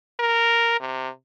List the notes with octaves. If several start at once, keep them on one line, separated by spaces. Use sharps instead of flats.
A#4
C3